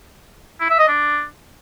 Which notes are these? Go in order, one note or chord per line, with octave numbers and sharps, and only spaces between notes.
E4
E5
D#5
D4